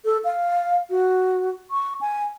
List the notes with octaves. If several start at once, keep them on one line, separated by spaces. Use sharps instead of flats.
A4
F5
F#4
C#6
G#5